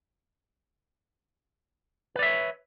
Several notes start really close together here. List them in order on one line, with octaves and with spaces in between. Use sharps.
B4 D5 E5 C#5